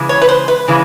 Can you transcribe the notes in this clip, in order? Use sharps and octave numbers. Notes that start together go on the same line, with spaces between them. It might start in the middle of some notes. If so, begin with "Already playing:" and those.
Already playing: C#3 E3 G#3
C#5
B4
C5
B4
C#3 E3 G#3